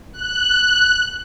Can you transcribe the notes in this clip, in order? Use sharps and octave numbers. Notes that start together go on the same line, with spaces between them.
F#6